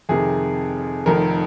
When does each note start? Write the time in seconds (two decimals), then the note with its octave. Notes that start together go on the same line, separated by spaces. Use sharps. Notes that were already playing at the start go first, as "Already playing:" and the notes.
0.09 F2 C3 D#3 G#4
1.06 F1 F2 D#3 A#4